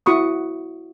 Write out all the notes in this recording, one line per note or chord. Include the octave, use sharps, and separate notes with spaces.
E4 F#4 B5 C#6 D#6